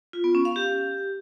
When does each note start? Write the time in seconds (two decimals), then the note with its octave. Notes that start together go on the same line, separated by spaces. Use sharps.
0.13 F4
0.24 B3
0.35 C#4
0.45 F5
0.56 G4